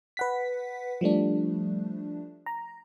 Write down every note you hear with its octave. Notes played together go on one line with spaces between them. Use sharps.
B4 F#5 B6
F3 G3 A3 D4
A#5